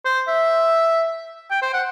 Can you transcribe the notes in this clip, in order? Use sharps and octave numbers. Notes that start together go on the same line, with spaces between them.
C5
E5
G5
C5
F#5